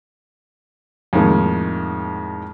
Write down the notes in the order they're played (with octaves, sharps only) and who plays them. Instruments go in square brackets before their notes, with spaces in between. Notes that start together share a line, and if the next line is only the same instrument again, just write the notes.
[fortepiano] F2 A2 D#3 G#3 A#3